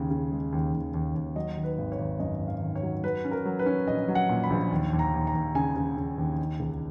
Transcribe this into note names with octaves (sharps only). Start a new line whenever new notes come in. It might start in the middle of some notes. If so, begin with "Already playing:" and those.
Already playing: D#2 C#3
C#3
G#3
D#2
D#2
D#2
D#2
F#3 D#5
D#3
B4
G#1
C#5
G#1
F#2 D#5
G#1
F5
D#3
C#5
F#3
F#3 B4
C#4
A#4
F#3
B4
C#4
A#1 D#5
F#3
F#5
A#2
B5
A#1
D#2
D#2
A#5
D#2
A#5
D#2
C#3 G#5
C#3
C#3
D#2
D#4
C#2